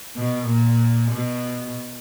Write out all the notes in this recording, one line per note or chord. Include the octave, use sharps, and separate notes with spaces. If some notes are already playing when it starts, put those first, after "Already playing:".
B2
A#2
B2